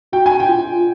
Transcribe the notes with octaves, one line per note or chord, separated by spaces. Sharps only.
F#4 G5
G#5
G5
F4